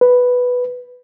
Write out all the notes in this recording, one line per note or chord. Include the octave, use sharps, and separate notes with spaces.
B4